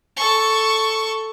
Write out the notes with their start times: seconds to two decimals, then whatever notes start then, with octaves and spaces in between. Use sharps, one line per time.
0.17 A4 C#6